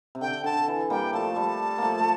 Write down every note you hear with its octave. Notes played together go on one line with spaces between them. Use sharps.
C3
D3 G5
D3 A5
E3
G3 A#3 G5
F3 A3 A5
G3
F3 A3 A#3
A3